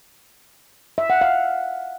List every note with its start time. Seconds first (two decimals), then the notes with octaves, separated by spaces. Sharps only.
0.98 E5
1.10 F#5
1.21 F5